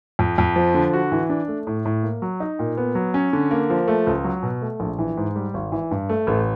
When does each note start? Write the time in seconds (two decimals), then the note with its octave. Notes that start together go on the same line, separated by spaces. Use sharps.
0.19 F2
0.38 F2
0.56 F3
0.74 D3
0.93 F#4
1.12 E3
1.30 D4
1.48 A3
1.67 A2
1.85 A2
2.03 A#3
2.22 F#3
2.40 D#4
2.59 A#2
2.77 B3
2.95 F#3
3.14 C#4
3.33 D3
3.51 A#3
3.70 F3
3.88 A3
4.07 C#2
4.24 F#3
4.43 B2
4.62 A3
4.80 A#1
4.99 E3
5.17 G#2
5.36 G3
5.54 G#1
5.72 E3
5.91 G2
6.09 A3
6.27 A1